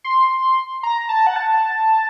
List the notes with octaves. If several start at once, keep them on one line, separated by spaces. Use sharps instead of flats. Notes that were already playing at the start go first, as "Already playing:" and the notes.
C6
A#5
A5
F#5
A5